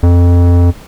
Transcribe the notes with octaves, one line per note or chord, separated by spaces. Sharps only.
F2